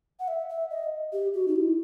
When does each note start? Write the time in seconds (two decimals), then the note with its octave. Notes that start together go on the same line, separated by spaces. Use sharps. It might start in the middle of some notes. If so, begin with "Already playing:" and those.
0.20 F#5
0.28 E5
0.49 E5
0.71 D#5
1.13 G4
1.34 F#4
1.48 D#4
1.56 E4